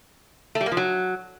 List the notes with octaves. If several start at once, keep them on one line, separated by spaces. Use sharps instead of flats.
A3
G3
A#3
F3
F#3